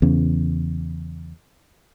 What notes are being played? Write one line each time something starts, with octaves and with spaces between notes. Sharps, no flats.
E2 C#3